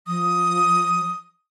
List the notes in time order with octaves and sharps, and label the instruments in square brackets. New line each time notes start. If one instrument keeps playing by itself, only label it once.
[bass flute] F3 [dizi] D#6